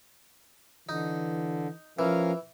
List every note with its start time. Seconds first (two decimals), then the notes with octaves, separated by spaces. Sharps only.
0.89 D3 E3 D#4
1.99 E3 F3 C#4 A#4 F5